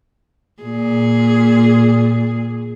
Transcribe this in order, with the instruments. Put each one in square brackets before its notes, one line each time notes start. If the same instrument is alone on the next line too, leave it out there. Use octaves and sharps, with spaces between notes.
[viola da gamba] A#2 G#4